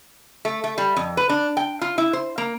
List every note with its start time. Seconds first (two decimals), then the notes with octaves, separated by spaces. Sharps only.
0.45 A3
0.64 A3
0.78 G3
0.96 F2
1.17 B4
1.29 D4
1.57 G5
1.81 F4
1.98 E4
2.13 C5
2.38 A#3